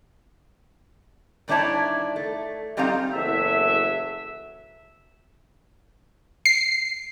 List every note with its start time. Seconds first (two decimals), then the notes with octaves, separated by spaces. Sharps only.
1.48 G2 D#3 D4 E4 C#5 A5
2.16 A3
2.77 E2 G3 C4 D#4 F5 A#5
3.12 F#1 E2 F#3 A4 E5
6.45 C7